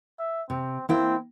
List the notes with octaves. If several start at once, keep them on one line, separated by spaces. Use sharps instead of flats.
E5
C3 C4
A#3 C4 E4 G5